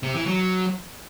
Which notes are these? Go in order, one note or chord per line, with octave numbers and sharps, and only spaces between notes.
C3
E3
F#3